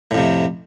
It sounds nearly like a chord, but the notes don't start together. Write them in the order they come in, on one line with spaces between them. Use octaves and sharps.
A2 F2 C3